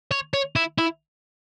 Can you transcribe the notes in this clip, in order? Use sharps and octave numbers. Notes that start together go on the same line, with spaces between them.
C#5
C#5
E4
E4